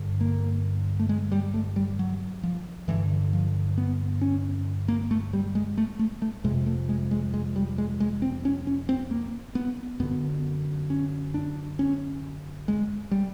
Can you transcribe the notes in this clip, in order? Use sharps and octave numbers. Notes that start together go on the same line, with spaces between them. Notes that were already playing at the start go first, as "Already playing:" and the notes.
Already playing: G2 D3
A#3
A3
G#3
G3
A3
G3
F#3
F3
G2 D3 E3
F3
B3
C#4
A#3
A3
G3
G#3
A3
A3
A3
F2 C3 G#3
A3
G#3
G#3
G#3
G3
G#3
G#3
C4
C#4
C#4
C4
A#3
B3
F#2 D3 B3
C#4
D4
C#4
G#3
G3